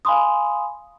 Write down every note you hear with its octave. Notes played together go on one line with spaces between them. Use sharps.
F5 G#5 B5 C6 D#6